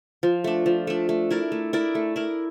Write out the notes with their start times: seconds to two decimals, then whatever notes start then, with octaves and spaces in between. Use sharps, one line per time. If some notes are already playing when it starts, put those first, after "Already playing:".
0.23 F3
0.44 A3 D4
0.66 F3
0.87 A3 D4
1.09 A3
1.31 E4 A#4 D5
1.52 A3
1.73 E4 A#4 D5
1.95 A3
2.16 E4 A#4